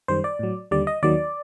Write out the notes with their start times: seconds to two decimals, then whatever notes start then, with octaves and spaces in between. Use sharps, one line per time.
0.08 F#2 D#3 G3 C5
0.24 D5
0.39 A2 F#3
0.71 D#2 D3 G3 D5
0.87 D#5
1.03 D#2 D#3 F#3 D5